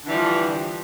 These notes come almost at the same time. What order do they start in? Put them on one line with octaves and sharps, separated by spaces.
D3 E3 G3 F3